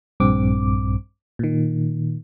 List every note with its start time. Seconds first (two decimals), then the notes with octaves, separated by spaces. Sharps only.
0.20 A#1 G2 C4 D6
1.39 A#2 D#3